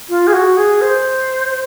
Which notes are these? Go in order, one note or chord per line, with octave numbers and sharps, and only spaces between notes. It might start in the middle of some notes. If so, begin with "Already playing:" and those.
F4
G#4
F#4
G#4
C5